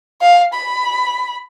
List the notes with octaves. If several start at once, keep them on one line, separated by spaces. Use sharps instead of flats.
F5
B5